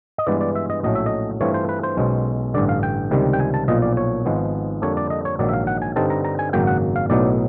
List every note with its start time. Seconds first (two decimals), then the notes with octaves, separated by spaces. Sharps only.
0.18 D#5
0.27 G2 E3 G#3 B3 D5
0.41 D5
0.55 E5
0.70 D#5
0.83 A#1 A2 F#3 A3 C#4 D#5
0.95 E5
1.06 D#5
1.41 G2 E3 A3 C4 F4 C#5
1.54 C5
1.69 B4
1.83 C5
1.97 B1 B2 G#3 C#4
2.54 A1 G2 D3 D5
2.69 F5
2.83 G5
3.11 C#2 C3 D#3 G3
3.33 G5
3.40 G#5
3.54 A5
3.68 B1 A#2 F3 D#5
3.82 D5
3.97 C#5
4.25 G#1 G#2 F3 G#3 B3
4.82 F2 D3 G3 A#3 D4 C#5
4.97 D5
5.10 D#5
5.25 C#5
5.39 A#1 G#2 D#3 F#3 D5
5.49 E5
5.53 F5
5.67 F#5
5.82 G#5
5.96 G2 D3 G3 C4 D#4 A5
6.10 A#5
6.25 A#5
6.39 G#5
6.53 G#1 F#2 C#3 F#3 A#3 G5
6.67 F#5
6.96 F5
7.10 B1 A2 F#3 B3 D#4 D5